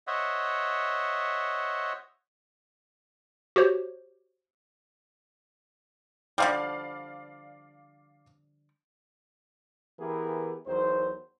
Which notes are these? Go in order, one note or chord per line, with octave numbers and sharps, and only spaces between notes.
C5 C#5 D#5 E5 F#5
F#4 G4 C5 C#5
D3 F3 G3 D5 F5
E3 B3 E4 G4 G#4 A#4
E2 D#3 F#3 C5